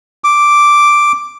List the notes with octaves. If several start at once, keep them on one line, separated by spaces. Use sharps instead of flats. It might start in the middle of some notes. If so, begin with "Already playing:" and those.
D6